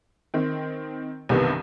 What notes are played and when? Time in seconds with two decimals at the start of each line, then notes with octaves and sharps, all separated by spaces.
0.34 D#3 C4
1.29 C2 G2 C3 D#3 E3 B3